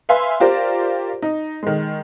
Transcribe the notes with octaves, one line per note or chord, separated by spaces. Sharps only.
B4 E5 F5 G#5 C6
F4 G4 A#4 C5 D5
D#4
D#3 G#3